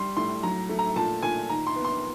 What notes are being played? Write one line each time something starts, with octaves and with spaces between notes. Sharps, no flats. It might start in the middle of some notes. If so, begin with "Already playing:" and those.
Already playing: G3 C6
A2 C6
F#3 A#5
A3
A#5
A#2 A5
A#2 G#5
D#3 A#5
C6
B3
C6